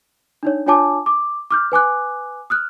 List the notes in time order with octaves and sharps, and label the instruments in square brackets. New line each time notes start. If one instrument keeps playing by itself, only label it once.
[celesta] D4 D#4 C#5
D4 F4 C#5 G#5 A5 D6
D6
D6 F6 G6
B4 G#5 D6 F#6
D#6 F6 F#6